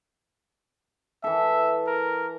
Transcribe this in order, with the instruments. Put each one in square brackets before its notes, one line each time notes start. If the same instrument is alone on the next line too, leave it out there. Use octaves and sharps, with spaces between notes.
[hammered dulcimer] E3 A4 [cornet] E5
[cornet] A#4